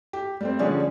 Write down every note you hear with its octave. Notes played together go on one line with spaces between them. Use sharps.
G4
G3 A3 C4
D3 F3 G3 C#4 D4 G#4